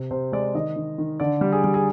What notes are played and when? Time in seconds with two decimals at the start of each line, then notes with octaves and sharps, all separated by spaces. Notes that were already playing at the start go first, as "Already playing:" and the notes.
Already playing: C3
0.11 C3 C5
0.32 G#3 D5
0.55 D#3 D#5
0.76 D#3
0.98 D#3
1.20 D3 D5
1.41 G3
1.52 G#4
1.64 G3
1.74 G#4